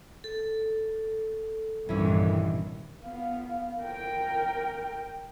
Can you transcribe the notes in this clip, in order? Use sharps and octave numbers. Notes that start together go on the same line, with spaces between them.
A4
C2 G2 A#2 D#3 E3 C#4 E4
B3 F5
A#4 G5